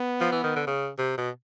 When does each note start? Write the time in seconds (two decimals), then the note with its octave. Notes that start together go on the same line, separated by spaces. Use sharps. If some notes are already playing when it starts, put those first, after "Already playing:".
Already playing: B3
0.21 F3
0.32 E3
0.44 D#3
0.56 D3
0.67 C#3
0.98 C3
1.18 B2